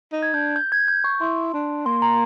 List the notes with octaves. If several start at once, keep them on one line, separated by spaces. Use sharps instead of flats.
D#4
G#6
D4 G6
G6
G#6
G6
C#6
E4 C6
D4
A#3 C6
A#5